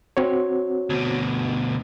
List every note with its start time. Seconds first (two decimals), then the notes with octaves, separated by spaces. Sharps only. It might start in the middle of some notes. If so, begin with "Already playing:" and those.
0.17 C4 F#4 C#5
0.90 D2 B2